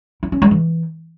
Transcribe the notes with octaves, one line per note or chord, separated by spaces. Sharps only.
E4
C#4
G#3
E3